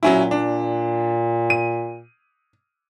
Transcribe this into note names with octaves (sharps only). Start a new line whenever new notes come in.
A#2 F#3 C#4 E4
D4
D#7